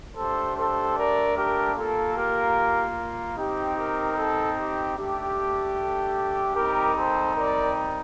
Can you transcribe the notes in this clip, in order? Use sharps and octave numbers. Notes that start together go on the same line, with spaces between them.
A3 D4 G4 A4 C5
A4 C5
A#4 D5
G4 A#4
A#3 F4 A4
G4 A#4
C4 D#4 G4
G4 A#4
A4
G4
A3 D4 G4
A4
G3 C4 D#4 G4 A#4
A4 C5
A#4 D5